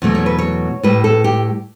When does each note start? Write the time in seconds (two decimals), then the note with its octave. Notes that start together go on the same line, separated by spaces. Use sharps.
0.02 E2 B2 F#3 A3
0.15 C#5
0.26 B4
0.39 C#5
0.83 A2 G3 B4
1.04 A4
1.24 G4